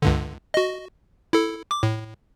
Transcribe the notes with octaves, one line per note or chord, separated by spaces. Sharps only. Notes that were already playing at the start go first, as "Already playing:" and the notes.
C#2 G2 D3
F#4 D#5
E4 A4
D6
A2